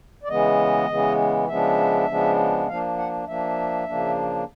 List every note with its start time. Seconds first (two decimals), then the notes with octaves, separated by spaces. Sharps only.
0.24 D5
0.28 C#3 E3 G#3 B3 D#5
0.89 C#3 E3 G#3 B3
1.48 C#3 F3 G#3 B3 D4 E5
2.08 C#3 F3 G#3 B3 D4
2.67 F3 A#3 D4 F5
2.98 F#5
3.27 F3 A#3 D4 E5
3.88 C#3 F3 A#3 D4